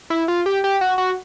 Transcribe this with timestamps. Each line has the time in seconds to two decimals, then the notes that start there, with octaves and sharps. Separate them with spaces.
0.10 E4
0.28 F4
0.46 G4
0.64 G4
0.81 F#4
0.98 F#4